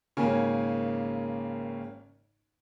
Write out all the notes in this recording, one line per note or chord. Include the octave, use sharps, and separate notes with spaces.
G#1 C#3 A#3 C#4 G#5